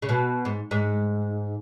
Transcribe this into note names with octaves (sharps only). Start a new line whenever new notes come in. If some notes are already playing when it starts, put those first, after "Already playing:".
C#3
B2
G#2
G#2